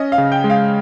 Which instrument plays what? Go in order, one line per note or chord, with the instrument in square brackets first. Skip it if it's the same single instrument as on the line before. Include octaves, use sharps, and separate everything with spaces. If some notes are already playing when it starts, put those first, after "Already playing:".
Already playing: [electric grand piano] C#4 [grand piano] D#5
[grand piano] F5
[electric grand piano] C#3
[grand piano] G5
[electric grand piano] G#3
[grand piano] F5